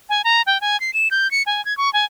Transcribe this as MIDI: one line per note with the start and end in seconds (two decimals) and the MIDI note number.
0.09 0.22 80
0.24 0.42 82
0.47 0.60 79
0.61 0.79 80
0.80 0.93 96
0.94 1.08 100
1.11 1.30 91
1.31 1.43 97
1.46 1.64 80
1.65 1.76 92
1.78 1.92 85
1.93 2.05 80